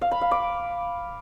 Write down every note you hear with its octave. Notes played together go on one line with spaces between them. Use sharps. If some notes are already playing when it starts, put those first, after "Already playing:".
F5
B5
F5
D6